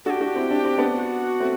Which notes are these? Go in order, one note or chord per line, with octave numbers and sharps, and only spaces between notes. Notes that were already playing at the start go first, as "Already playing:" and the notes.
D4 F#4 G4 A4
D4 F#4
C4 E4
D4
C4
B3 D4
F#4
A3 C4